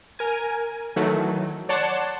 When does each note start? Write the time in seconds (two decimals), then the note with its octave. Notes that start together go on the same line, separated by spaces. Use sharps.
0.19 A#4 G#5
0.96 D#3 E3 F#3 A3
1.69 C#5 D5 F#5 A5 C6